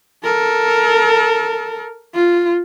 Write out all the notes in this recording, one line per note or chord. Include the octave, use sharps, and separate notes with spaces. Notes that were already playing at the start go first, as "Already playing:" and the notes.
A4 A#4
F4